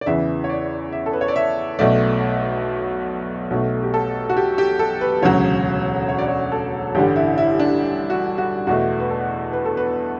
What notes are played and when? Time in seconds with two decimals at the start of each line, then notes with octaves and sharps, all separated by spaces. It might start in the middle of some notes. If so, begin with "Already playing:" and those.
0.01 D5
0.06 E2 C#3 E3 E5
0.44 C#5
0.49 D5
0.92 E5
1.06 A4
1.13 B4
1.21 C#5
1.28 D5
1.36 E5
1.79 B1 B2 A3 D5
3.50 B1 B2 A3
3.83 G4
3.94 A4
4.29 F#4
4.37 G4
4.58 G4
4.79 A4
5.01 B4
5.22 E1 D2 C#3 F#3 C#5
6.09 C#5
6.18 D5
6.28 C#5
6.52 A4
6.95 A1 G2 D3 G3 G4
7.16 E4
7.38 E4
7.60 D4
8.10 F#4
8.38 F#4
8.67 E2 B2 A3 F#4
9.00 B4
9.10 A4
9.53 B4
9.65 A4
9.77 B4